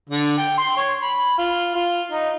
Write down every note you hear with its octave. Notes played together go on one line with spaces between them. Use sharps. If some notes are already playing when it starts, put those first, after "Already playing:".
D3
G5
C6
C#5
B5
F4
F4
D#4